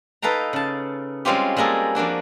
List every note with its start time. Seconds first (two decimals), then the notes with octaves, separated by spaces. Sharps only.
0.22 D#4 A4 B4 F5 G5 A#5
0.53 C#3 A5
1.25 G3 G#3 C4 C#4 F4 G4
1.57 G3 G#3 A#3 G#4 A4
1.95 F3 A#3 D4 F#4